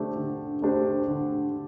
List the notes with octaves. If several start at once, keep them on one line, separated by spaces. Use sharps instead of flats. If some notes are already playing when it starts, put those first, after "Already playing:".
Already playing: D3 A3 D4 G4 C5
D3
A3 D4 G4 C5
D3